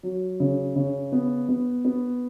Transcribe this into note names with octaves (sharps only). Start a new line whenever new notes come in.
F#3
C#3
C#3
B3
B3
B3